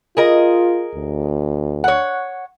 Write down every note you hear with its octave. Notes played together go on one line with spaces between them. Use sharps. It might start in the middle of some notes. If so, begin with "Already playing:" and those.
F4 G#4 A#4 D#5
D2
C#5 F#5